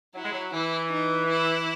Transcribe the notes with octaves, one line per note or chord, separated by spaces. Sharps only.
F#3 E4
G#3
F#3
E3 E4
D#4
E4